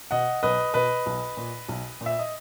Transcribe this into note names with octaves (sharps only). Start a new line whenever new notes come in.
B2 D#5 F#5
B1 B4 D#5
B2 B4 D#5
B1
A#2
B1
A#2
E5
D#5